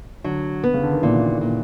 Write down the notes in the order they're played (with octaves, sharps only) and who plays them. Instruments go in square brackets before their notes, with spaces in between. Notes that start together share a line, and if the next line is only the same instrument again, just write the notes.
[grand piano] D3 [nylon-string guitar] F#3
[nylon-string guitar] B3
[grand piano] C#3
D3
D#3
[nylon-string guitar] A#2 [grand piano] E3
[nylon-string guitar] A#2